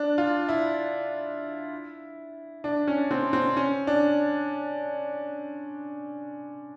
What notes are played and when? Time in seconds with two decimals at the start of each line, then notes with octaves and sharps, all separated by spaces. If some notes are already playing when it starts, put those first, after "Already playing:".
Already playing: D4
0.18 F4
0.49 E4
2.64 D4
2.87 C#4
3.11 C4
3.33 C4
3.57 C#4
3.87 D4